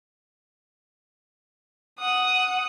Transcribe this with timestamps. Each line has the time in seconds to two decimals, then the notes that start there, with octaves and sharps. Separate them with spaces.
1.99 F#5 D#6